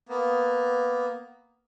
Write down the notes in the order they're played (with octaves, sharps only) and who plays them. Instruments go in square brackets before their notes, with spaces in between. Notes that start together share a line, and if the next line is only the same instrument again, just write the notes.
[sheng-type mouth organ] A#3 B3